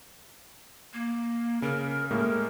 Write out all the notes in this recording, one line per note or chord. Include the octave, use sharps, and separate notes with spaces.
A#3
C#3 A#4
A2 G#3 A#3 A#4